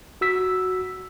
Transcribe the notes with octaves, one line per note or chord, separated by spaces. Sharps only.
F#4 E6 B6